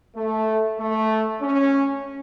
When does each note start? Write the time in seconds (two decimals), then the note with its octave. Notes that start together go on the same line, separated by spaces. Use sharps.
0.16 A3
0.79 A3
1.42 C#4